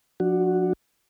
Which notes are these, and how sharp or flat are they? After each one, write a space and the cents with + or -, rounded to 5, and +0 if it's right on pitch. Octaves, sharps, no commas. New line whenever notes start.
F3 +35 D4 +15 F#4 +0